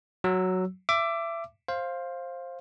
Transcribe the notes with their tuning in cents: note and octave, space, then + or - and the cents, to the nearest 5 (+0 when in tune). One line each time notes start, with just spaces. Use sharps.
F#3 +0 E6 +0
E5 +25 D6 +0
C5 +15 F5 +0